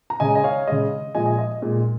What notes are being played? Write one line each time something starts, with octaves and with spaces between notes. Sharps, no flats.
A#5
C#3 G#3 D#5 G#5
D#5
C#5 F5
C#3 G#3 D#5
A#2 F3 G#3 D#5 G#5
D#5
D#5
A#2 G#3